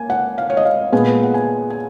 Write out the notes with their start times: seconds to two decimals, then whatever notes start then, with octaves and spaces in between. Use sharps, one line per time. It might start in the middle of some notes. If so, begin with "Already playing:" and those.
Already playing: A#3 G#5
0.10 F#5
0.38 F5
0.50 C#5
0.57 D#5
0.65 F5
0.92 A#2 G#3 B3 G#5
1.23 F#5
1.34 G#5
1.70 G#5